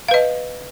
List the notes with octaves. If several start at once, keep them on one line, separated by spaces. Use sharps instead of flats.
B4 D#5 F5